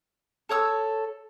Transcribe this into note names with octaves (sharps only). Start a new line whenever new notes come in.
A4 C#5 D#6 E6